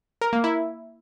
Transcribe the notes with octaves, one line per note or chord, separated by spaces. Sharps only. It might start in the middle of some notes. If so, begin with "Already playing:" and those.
A#4
A#3
E4